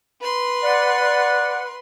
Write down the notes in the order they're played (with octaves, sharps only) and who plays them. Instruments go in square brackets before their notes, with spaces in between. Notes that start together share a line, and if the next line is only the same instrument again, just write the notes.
[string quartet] B4 C6
[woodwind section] D5 F#5